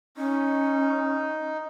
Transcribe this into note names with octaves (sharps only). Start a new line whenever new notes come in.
C#4 D#4